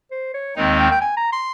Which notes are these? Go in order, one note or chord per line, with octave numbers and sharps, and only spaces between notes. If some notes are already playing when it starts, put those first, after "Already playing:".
C5
C#5
D#2 D#3 G#3 C4 D#4 D#5
G5
G5
G#5
A#5
C6